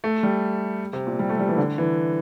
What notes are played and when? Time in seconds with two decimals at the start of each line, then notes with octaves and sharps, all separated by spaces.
0.04 A3
0.23 G3
0.93 C3
1.07 A#2
1.19 G3
1.29 A3
1.39 G3
1.48 E3
1.58 D3
1.78 E3